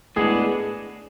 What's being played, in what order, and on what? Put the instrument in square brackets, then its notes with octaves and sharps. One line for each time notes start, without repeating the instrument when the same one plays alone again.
[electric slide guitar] A2 G#3 B3 D4 [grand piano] G#4